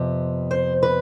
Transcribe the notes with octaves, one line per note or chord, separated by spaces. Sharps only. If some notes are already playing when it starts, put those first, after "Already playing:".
Already playing: F2 C3 B3
C5
B4